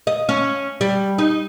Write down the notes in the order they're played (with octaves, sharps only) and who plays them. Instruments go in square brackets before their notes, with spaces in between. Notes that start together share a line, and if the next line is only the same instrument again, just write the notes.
[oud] D#5
C#4
G3
D#4